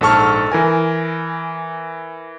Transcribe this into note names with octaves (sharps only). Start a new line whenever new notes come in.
A#1 G#2 A4 A5 C#6 F6
E3 A#4 G#5